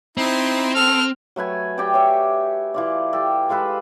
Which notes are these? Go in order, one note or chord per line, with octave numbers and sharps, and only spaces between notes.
C4 D#4 E4
A4 F6
F#3 A3 B4 G#5
G4 D5 E5 G5
C#5 E5
E3 F4 D5
G4 A4
G#3 F4 A4 B4